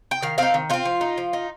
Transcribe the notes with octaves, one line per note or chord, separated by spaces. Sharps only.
G5
D#3 F5
C4 D#4 F5
D#3
C4 D#4 F4
F3
D#4
F3
D#4